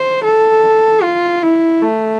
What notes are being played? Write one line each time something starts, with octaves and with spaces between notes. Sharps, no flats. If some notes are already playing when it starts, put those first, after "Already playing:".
Already playing: C5
A4
F4
E4
A3